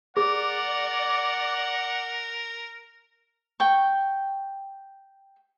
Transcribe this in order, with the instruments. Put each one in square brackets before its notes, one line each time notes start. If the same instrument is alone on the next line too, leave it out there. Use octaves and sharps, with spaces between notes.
[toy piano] G#4 [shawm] A#4 [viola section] D5 [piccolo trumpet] F#5
[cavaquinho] G5 C#6